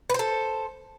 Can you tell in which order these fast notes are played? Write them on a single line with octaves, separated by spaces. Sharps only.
B4 C5 A4